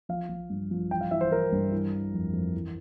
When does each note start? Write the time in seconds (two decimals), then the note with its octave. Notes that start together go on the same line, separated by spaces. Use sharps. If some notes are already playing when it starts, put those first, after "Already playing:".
0.09 F3 F5
0.29 F3
0.50 G2
0.71 F3
0.91 E3 G5
1.01 F5
1.11 E3 E5
1.21 C5
1.31 E3 A#4
1.52 G2
1.72 E3
1.92 E3
2.14 F2
2.33 F2
2.54 E3